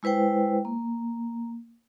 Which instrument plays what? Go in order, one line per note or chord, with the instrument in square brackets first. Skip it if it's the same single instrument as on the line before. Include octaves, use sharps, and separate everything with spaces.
[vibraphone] G#3 E4 B4 C5 G5
A#3